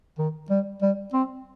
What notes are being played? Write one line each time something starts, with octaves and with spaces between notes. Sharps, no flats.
D#3
G3
G3
C4